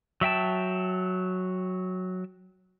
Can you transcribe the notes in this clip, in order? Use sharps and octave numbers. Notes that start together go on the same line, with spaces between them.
F#3 E5 G5 A5